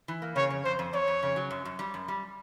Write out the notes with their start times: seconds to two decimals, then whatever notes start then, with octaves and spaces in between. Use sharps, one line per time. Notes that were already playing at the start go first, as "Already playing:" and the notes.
0.08 E3
0.22 A#3
0.36 C#3 C#5
0.50 F2
0.65 F2 C5
0.79 F2
0.93 F2 C#5
1.08 F2
1.23 C#3
1.36 F#3
1.51 F#2
1.65 F#2
1.79 G3
1.94 F#2
2.08 G3